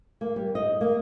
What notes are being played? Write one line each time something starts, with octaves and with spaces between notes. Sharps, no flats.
A#3
G3
D#5
A#3